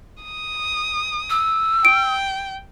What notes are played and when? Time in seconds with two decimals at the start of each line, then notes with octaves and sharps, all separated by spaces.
0.23 D#6
1.30 E6
1.85 G5 D7